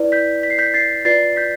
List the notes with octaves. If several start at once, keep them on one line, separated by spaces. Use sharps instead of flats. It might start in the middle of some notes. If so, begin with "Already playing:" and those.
Already playing: E4 B4 D5
G6 B6
B6
C7
G6 B6
A6 C7
F4 B4 D5 A6 C7
G6 B6